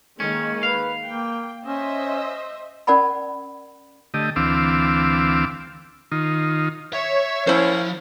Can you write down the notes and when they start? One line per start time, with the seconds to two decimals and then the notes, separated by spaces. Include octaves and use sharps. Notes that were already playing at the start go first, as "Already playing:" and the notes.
0.20 D#3 G#3 A#3 C#4
0.63 B4 F5
1.05 A#3 G5
1.66 C#4 C5 D#5 E5
2.87 C#4 A#4 D5 F#5 A5 B5
4.14 D3 A3 G4 D#5
4.36 D2 E3 C4 F5 D6 E6
6.12 D#3 D#4 F4
6.93 C#5 E5
7.47 A2 F3 A#3 C#4 E4 C5